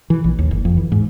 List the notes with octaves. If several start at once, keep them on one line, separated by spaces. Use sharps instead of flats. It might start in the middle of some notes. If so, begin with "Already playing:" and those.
E3
A#1
D#2
F#1
F2
E3
G#2